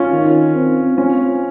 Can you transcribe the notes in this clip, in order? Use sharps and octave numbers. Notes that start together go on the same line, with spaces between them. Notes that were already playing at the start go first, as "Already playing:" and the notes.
Already playing: C#4 F4
D#3
C4
C4 C#4 F4